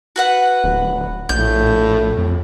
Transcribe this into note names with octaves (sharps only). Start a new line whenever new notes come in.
F#4 B4 F#5
D1
A#1 A2 G6
F2